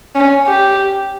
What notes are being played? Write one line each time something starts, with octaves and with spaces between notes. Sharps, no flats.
C#4
G4